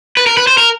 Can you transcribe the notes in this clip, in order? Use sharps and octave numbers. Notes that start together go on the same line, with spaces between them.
B4
A#4
B4
C5
A#4